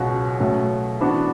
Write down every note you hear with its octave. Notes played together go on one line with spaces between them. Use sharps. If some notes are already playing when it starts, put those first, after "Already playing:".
Already playing: C#2 B2 F#3 C#4 F#4
B2 F#3 A3
E3 B3 D4 F#4